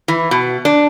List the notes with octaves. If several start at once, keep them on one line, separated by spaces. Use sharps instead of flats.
E3
B2
D4